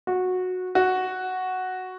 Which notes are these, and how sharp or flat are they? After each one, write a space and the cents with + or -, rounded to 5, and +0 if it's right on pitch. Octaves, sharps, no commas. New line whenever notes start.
F#4 -15
F#4 +0